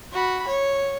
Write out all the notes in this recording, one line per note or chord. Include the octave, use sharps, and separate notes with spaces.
F#4 B5
C#5